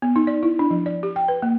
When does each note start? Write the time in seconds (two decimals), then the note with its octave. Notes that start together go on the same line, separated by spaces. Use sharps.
0.02 B3
0.16 D#4
0.27 D5
0.43 E4
0.59 D4
0.71 F3
0.86 D5
1.03 G4
1.16 G5
1.28 B4
1.42 A#3